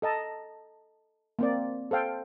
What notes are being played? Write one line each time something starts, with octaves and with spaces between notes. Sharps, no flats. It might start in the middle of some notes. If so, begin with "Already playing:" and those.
A4 D#5 A5 A#5
A#3 C4 D5
A4 C5 F5 G5